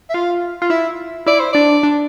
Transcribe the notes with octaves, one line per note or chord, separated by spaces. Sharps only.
E5
F4 F5
F4
E4 E5
E4 D5
C5
D4 D5
D4